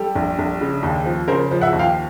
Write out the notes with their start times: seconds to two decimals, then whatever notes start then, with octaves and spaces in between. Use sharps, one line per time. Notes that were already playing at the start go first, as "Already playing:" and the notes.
Already playing: G3 G4 A4
0.15 A#1
0.39 A#1
0.61 C#3
0.83 D#2
1.06 F3
1.28 C#3 A#4 C5
1.51 F3
1.61 E5 F#5
1.73 D#2
1.79 F5 G5